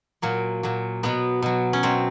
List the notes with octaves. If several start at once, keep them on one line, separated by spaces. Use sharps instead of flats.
A#2 F#3 A#3
A#2 F#3
B2 F#3 B3
B2 F#3
C#4
B2 F#3 C4